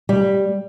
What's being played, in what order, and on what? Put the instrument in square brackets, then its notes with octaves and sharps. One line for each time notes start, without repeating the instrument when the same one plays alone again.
[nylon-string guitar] G3